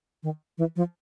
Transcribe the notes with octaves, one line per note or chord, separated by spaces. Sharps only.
D#3
E3
F3